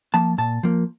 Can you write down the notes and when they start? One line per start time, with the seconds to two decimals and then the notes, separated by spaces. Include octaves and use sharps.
0.14 F3 A#3 A5
0.38 A#2 A5
0.63 F3 A#3